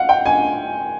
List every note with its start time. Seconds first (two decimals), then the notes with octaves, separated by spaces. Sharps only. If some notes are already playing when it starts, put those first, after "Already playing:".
Already playing: F5 F#5
0.09 G5
0.26 G#5